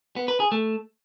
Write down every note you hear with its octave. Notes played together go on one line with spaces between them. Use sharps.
B3
B4
G#4
A3